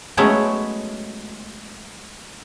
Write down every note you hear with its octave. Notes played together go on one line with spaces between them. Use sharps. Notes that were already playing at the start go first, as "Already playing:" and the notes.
F#3 G#3 A3 B3 C#4 E4